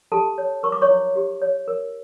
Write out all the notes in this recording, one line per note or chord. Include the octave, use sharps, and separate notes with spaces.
G4 A4 A5
C#5
A#4 C#6
D6
C#5 C#6
E4
G4
C#5
A#4